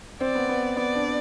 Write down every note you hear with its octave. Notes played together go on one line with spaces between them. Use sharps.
C4 D5
B3
B3
B3 D5
D4